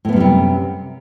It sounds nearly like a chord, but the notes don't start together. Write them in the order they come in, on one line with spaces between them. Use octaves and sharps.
A2 B3 F#2 G3 C3